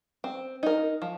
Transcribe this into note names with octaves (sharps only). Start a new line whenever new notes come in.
C4
D#4 A#4
F3